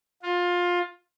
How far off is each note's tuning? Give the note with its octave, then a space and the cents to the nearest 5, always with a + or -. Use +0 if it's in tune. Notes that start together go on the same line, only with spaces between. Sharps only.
F4 +20